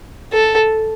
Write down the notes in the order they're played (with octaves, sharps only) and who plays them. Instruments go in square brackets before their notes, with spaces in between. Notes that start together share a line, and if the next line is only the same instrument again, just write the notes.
[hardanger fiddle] A4